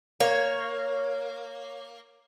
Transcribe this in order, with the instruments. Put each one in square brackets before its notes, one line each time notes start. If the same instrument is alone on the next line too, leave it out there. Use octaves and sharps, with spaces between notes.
[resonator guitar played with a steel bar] A#3 [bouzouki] C#5